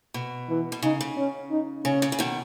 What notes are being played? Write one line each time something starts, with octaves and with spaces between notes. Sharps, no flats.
B2
E3
B2
C#3 D#4
C#3
C#4
D#4
C#3 C#4
C#3
C#3
B2 D#3